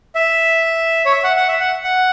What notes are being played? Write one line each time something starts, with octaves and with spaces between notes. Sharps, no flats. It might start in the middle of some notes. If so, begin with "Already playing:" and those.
E5
C#5
E5
F#5
F#5
E5
F#5
F#5